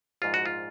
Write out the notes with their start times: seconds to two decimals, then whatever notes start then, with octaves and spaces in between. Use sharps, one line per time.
0.22 A#1 G#2 F3 F4
0.34 F#4
0.46 F4